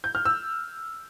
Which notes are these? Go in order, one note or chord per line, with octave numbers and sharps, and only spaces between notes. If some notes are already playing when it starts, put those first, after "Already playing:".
G6
F6
E6